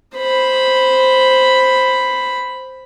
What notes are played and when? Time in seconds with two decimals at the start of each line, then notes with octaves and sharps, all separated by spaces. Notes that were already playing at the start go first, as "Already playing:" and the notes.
0.16 C5 B5